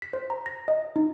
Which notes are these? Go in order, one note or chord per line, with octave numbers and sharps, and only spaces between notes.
B6
C5
A#5
A#6
D#5
D#4